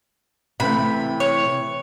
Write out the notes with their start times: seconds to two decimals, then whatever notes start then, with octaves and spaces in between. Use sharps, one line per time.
0.60 C3 E3 A3 B5
1.20 C#5